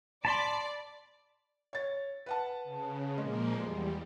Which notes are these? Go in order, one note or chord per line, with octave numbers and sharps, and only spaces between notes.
D5 A5 B5 C6
C#5 A6
B4 F#5 A5
C#3
A#2 F3 G#3 A#3
E2 G3 G#3